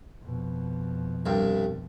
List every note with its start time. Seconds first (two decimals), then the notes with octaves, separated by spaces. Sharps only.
0.22 F2 B2
1.26 C2 G2